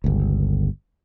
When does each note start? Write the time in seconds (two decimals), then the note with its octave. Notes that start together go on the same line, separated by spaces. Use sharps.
0.04 G1 C#2